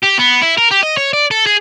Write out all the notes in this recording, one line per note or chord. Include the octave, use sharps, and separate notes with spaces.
G4
B3
E4
A#4
G4
D#5
C#5
D5
A4
G#4